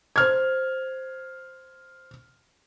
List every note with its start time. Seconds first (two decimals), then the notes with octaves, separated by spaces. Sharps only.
0.16 C5 F6 G#6